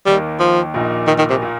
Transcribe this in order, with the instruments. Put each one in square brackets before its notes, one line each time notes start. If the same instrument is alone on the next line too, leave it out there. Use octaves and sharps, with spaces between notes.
[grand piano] D#2 D#3 A#3 [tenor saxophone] G3
[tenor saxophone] F3
[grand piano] A#1 A#2 A#3 D#4
[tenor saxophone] D#3
D#3
C3
[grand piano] A#2 A#3